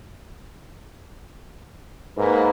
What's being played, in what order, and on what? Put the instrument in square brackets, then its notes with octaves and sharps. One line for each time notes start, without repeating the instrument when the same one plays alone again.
[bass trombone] G#2 [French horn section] A#3 B4